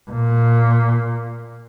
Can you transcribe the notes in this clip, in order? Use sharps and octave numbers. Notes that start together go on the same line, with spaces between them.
A#2